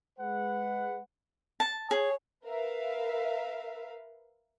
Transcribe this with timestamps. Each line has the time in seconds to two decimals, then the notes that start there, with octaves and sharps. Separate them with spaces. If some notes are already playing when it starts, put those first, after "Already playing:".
0.19 G#3 B4 F#5
1.60 A5
1.91 G#4 C#5
2.44 A#4 B4 E5 F5